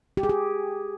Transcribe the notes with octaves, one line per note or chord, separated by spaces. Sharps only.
G4
G#4
G4